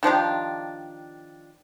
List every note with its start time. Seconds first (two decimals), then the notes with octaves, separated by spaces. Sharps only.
0.03 D#3 F3 D4 G4